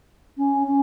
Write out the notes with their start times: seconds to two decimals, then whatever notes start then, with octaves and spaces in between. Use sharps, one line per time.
0.37 C#4
0.67 C#4